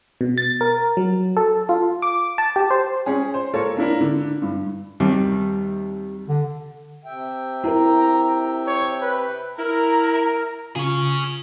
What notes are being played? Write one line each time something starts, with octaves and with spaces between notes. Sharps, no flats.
B2
A6
A#4
F#3
A4
F4
D6
A5
G4
C5
C#4 G#4
C5
A#3 A4 C#5
A#3 D4 E4 A#4
D3
G2
D#2 C3 G3
D3
C3 E5 G5
E4 A#4 A#5
C#5
B4
E4 A#4 A#5
C#3 F4 G#4 C#5